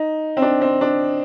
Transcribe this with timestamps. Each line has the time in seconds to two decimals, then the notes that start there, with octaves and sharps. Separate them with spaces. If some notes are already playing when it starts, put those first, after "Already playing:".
Already playing: D#4
0.37 C4
0.42 D4
0.61 C4
0.81 D4